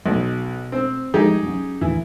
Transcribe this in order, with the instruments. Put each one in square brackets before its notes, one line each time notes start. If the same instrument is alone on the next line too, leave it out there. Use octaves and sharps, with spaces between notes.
[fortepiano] B1 [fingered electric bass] B2
[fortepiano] C4
[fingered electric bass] F3 G#3 [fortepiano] D#4 G4 G#4
[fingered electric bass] F#3 C#4
[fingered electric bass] D#2 A2 D#3 [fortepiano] E3